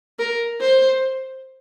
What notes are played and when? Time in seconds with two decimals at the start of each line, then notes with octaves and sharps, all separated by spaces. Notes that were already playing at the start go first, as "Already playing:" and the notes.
0.19 A#4
0.61 C5